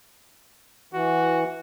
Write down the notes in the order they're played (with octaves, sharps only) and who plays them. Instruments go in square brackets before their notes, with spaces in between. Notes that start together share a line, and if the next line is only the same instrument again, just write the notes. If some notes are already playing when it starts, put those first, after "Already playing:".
[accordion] E3 [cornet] F#4